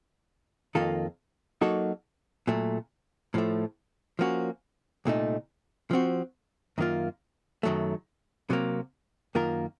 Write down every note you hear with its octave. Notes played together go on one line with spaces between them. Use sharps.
F2 D#3 A#3 F4 A4
F#3 A#3 D#4 F#4 A4
A#2 F#3 A3
A2 F3 A3
F3 A#3 C#4 F#4
C2 A#2 A3 D#4
F3 C4 F#4
F#2 D#3 A#3 F4
F#2 D#3 F#3 A3
C3 F#3 A#3
F#2 D#3 A#3 F4 A#4